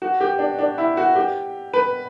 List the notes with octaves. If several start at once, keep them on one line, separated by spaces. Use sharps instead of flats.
F#4
G4
D4
D4
E4
F#4
G4
B4